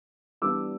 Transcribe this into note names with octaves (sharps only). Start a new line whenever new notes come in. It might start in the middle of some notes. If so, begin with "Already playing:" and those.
E3 G3 B3 D4 D6 E6